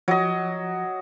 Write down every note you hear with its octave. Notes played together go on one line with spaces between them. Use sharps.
F3 F#3 D#5